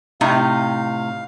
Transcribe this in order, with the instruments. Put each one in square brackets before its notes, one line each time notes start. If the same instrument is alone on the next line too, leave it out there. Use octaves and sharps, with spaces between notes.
[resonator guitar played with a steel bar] A2 C3 D#4 [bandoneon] F5